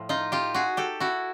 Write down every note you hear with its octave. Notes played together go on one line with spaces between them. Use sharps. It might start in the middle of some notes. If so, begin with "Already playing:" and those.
Already playing: A2 F3
D#4 F4
F4 G4
F#4 G#4
G4 A4
E4 F#4